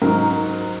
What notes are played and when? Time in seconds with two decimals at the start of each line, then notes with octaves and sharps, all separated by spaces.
0.02 G#2 F#3 D#4 A#4